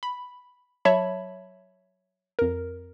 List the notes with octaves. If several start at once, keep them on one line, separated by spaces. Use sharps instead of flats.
B5
F#3 C#5 E5 A5 B5
F2 A#4